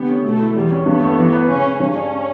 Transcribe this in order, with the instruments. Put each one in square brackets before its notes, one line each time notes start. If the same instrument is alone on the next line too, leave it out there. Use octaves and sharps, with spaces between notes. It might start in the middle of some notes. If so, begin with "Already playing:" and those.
Already playing: [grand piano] D3 G4 [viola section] B3
[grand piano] C#4
[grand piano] B2 [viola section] A3
[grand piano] E4
[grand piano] E2 [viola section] G3
[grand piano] C#4
[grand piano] G2 [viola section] B3
[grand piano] A3
E3
B4
[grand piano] C#3 [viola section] C#4
[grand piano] C#3
[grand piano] G2 [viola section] C#4
[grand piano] D4